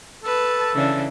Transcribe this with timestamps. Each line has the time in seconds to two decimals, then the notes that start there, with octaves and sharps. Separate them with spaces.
0.24 A4 B4 A5
0.75 C#3 E3 D4